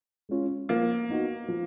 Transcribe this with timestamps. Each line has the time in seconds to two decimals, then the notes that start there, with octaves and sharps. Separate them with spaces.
0.29 G#3 C#4 F4
0.69 F3 A#3
1.09 B3 D#4 F#4
1.48 F3